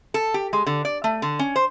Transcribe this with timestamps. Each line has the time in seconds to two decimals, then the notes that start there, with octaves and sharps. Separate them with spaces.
0.14 A4
0.34 G4
0.53 G#3
0.66 D3
0.85 D5
1.04 A3
1.22 D3
1.39 C#4
1.56 C5